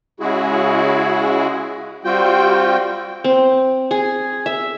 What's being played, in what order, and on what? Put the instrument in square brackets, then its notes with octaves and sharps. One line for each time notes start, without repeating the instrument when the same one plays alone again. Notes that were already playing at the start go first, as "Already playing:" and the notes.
[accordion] C#3 G#3 E4 F#4 G#4
G3 C4 F4 F#4 G5
[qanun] C4
G#4
E5